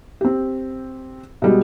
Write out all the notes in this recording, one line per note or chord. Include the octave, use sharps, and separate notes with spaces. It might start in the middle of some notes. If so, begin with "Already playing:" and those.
C4 G4
B2 G3 G#3